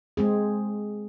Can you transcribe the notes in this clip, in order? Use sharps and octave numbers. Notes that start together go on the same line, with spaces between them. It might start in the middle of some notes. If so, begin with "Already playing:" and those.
G#3 C4 G#4